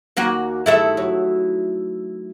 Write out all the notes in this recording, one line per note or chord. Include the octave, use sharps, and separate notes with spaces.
D#2 A#3 F#4
G2 D#3 A3 E4 A4 E5
F#3